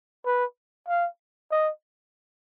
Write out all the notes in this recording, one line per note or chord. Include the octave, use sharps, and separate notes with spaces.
B4
F5
D#5